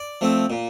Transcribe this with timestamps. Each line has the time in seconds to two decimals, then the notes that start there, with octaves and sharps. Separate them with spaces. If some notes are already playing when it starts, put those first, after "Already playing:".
Already playing: D5
0.21 F3 A3 C4
0.50 A#2